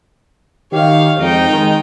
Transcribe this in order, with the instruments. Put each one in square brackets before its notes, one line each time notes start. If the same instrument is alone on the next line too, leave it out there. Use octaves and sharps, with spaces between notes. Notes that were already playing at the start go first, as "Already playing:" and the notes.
[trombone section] D#3 G4 [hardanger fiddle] C#5 F5
[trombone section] F2 G#2 [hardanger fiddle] D#4 G5
[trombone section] D#3 G#3